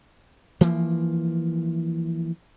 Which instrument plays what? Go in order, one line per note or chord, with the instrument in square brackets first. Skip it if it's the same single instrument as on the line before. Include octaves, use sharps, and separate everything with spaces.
[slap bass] E3 F3 A#3